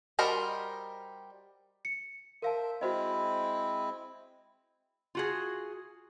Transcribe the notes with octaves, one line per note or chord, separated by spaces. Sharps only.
G3 F#4 A#4 C5 D#5
C#7
A#4 C5 E5 F5 A5
G#3 C4 E4 F#4 C5 D#5
F4 F#4 G#4